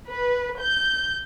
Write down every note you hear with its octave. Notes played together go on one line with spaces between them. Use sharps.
B4
G6